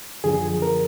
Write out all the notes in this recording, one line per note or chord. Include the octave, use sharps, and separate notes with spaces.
F#2 D3 F3 G#4
A#4